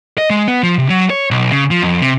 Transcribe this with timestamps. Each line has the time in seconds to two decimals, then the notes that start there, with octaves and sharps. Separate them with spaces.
0.18 D#5
0.30 G#3
0.48 B3
0.63 F3
0.78 C3
0.90 F#3
1.10 C#5
1.31 B1
1.51 C#3
1.71 F3
1.82 F2
2.02 C3